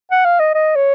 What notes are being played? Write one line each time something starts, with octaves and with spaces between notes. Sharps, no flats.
F#5
F5
D#5
D#5
C#5